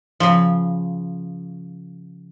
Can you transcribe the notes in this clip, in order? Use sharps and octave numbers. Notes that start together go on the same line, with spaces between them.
C#3 F3